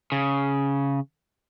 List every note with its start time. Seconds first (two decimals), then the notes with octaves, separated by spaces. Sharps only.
0.12 C#3